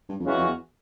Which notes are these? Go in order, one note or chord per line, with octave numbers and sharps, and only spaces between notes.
G2
F2
F#2 C#3 E3 G#3 C#4 F#4
F2
E2